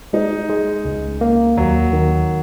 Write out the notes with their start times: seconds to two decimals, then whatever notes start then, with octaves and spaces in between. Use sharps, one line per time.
0.13 G#3 D#4
0.49 G#3
0.85 C#2
1.21 A#3
1.57 D#2 F#3
1.93 D#3